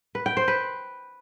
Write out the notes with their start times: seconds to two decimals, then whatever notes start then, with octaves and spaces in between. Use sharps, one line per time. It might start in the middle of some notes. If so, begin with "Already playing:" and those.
0.15 B4
0.26 G5
0.37 C5
0.48 B4